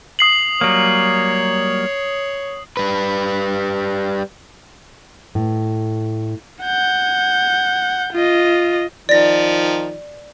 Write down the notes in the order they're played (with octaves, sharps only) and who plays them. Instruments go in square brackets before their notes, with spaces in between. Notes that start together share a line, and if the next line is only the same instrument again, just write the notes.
[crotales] D#6 C7 F#7
[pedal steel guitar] F#3 G3 A#3 [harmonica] C#5
[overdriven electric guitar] G3 B4
[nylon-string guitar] A2
[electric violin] F#5 G6
F4 D#5
[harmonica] D#3 F3 [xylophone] D5 A#6